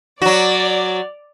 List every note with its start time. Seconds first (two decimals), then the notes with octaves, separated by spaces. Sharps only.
0.22 F#3 F#4 D5